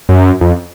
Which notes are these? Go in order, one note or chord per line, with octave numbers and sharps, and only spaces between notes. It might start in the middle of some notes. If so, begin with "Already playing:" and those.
F#2
F2